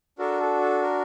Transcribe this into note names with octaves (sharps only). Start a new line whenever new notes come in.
D4 F#4 A4 A#4
A4
A4
A#4